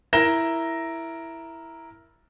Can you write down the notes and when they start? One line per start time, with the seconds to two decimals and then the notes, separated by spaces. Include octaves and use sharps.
0.13 E4 A#4 A#6 E7 G7